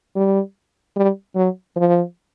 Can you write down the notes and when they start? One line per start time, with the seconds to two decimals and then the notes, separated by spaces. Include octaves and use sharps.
0.16 G3
0.96 G3
1.35 F#3
1.76 F3